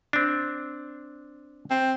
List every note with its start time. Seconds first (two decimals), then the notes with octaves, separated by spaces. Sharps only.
0.13 C4 D4
1.70 C4